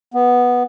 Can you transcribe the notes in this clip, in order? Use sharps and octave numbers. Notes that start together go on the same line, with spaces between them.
B3